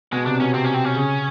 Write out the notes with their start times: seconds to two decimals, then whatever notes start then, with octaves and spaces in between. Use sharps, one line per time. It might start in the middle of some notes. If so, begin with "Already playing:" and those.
0.12 B2 G#3
0.26 C3 D4
0.40 B2 C#4
0.53 C3 C4
0.64 C#4
0.74 C4
0.85 C#4
0.95 C#3